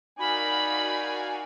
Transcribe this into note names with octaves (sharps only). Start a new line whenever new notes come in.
D#4 F#4 A#4 D5 F5 G#5 B5